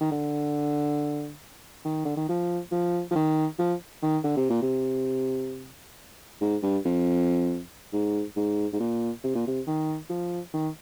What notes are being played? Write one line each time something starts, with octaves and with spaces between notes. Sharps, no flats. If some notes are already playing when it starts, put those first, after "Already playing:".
D#3
D3
D#3
D3
D#3
F3
F3
F3
D#3
F3
D#3
D3
C3
A#2
C3
G#2
G2
F2
G#2
G#2
G#2
A#2
C3
A#2
C3
D#3
F3
D#3